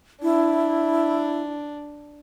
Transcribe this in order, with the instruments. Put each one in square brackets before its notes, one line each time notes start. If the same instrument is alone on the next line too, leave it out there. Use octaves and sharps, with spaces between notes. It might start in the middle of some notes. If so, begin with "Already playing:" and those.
[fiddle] D4 [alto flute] E4